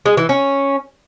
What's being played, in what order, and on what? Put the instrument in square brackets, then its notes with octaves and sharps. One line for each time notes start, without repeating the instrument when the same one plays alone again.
[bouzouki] G#3
E3
C#4